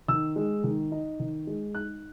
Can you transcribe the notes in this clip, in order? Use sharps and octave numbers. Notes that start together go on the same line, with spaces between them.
D#3 E6
G#3
D#3
D#4
D#3
G#3
D#4 F#6